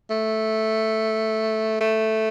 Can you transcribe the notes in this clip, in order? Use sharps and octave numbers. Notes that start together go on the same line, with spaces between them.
A3
A3